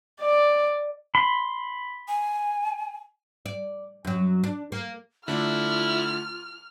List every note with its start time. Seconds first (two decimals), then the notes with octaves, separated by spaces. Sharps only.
0.21 D5
1.15 B5 C6
2.08 G#5
3.46 D5
4.05 F#2 F#3
4.44 D4
4.72 A#3
5.28 D3 A3 D4 E4 F4 F6